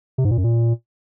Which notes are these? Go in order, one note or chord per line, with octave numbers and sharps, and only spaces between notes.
C3
G#2
A#2
F#2
A#2